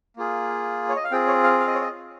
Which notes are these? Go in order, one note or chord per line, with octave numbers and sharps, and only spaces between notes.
A#3 F4 G#4
C#5
D#5
F5
C4 F4 G#4 G5
C#5
F5
F5
D#5
C#5
D#5